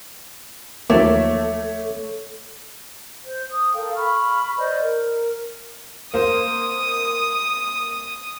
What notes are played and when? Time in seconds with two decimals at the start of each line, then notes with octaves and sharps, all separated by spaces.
0.90 D#2 F3 F#3 A3 A#3 C#5 E5 D6
3.24 C5
3.50 D#6
3.74 A4 A#4 F5 G5
3.94 B5 C#6 F6
4.57 B4 C5 D5 D#5
4.82 A#4
6.14 A#3 C5 D#6